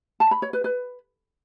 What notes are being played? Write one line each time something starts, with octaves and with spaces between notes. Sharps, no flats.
A5
B5
C#5
B4
B4